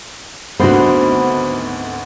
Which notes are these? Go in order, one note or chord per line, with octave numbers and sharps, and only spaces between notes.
G#1 D2 D3 B3 F#4 C5